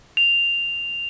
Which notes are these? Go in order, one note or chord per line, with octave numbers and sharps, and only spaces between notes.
F7